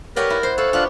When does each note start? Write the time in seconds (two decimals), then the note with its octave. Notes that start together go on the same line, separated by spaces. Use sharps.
0.16 G4 A#4 B4 C#5 D5 F#5 G5
0.30 E4
0.43 C5 C6
0.58 A4 C5 C#5 F5 F#6
0.73 B3 D4 F4 G4 F#6